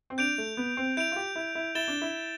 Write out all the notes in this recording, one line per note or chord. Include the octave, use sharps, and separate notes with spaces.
C4
D4 G6 D7 F7
A3
B3
C4
E4 G6 D7 F7
F4
G4
E4
E4
E4 A6 E7 G7
D4
E4